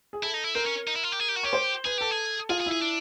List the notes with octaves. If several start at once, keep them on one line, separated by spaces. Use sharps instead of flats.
G#4
E4 A4
D#4
E4
C4 A#4
C#4
D#4
E4
F4
G4
G#4
G4
F#4
G4 C#5
C5
G#4 B4
G4 A4
G#4
F4 G#4
G#4
E4
G#4
D4